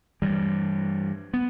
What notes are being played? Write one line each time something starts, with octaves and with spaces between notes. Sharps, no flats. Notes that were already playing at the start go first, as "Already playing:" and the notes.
G2 E3 G3
B3